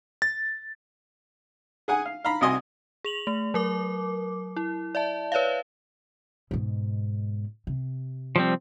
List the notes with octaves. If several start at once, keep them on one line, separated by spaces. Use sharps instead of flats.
A6
G#4 F#5 G#5
F5
F5 A#5 B5
C2 C3 F#4 D#5 G#5 C6
G#4 F7 F#7
A3
F#3 A#4 D6
E4
D5 E5 A5
B4 C#5 D5 E5 F5
G#2 B2
C3
F3 G3 C4